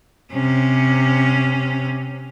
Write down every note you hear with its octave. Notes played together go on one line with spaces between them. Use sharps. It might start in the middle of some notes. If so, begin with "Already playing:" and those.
C3 C#4